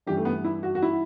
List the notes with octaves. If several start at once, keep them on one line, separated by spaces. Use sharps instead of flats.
G2 E3 G3 G4
A3
B3
E4
F#4
F#4
E4